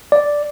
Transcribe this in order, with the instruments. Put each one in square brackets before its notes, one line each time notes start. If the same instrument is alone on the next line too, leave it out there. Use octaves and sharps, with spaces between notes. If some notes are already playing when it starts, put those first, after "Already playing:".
[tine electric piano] D5